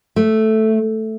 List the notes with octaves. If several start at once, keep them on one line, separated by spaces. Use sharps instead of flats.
A3